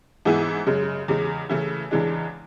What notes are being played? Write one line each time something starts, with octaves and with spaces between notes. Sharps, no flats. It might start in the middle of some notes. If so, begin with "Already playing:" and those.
G#2 E3 B3 E4 G#4
F#2 C#3 G#3
E2 C#3 G#3
C#3 E3 A3 E4
E2 C#3 E3 G#3 D4